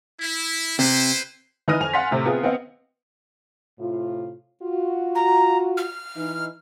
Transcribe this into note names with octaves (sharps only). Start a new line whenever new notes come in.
E4
C3 E4 B4 C5
E3 D#4 B4 F6 A#6 D#7
F2 G#5 F7
F5 F#5 G#5 C6 A6 B6
A2 C3
B3 C4 F4 G#4
B3 C4 D#5 F5 F#5
A2 C3 F4
F4 F#4
A#5
F6
E3 D#4